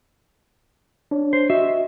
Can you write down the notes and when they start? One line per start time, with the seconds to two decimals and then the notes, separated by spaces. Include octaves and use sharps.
1.11 D4 C#5
1.33 C5
1.50 F#4 D#5 E5